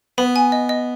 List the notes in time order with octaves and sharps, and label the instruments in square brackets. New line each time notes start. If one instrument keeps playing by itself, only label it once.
[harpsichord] B3 [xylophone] B5
[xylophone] G#5
D#5
D#5